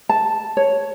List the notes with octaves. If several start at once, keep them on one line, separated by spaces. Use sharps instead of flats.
A5
C#5